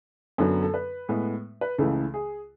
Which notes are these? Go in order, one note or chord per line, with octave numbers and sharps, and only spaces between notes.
F#2 D3 F#3 B3 A4
A4
B4
A2 G#3 B3
B4
C#2 C#3 E3 A3 A4
G#4